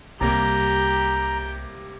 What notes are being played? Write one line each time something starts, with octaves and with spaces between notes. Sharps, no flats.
C2 C3 G3 A#3 G4 A#5